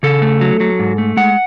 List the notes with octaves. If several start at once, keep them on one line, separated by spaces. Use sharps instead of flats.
C#3 A4
A3
F#3
F#3
G#2
A3
G#3 F#5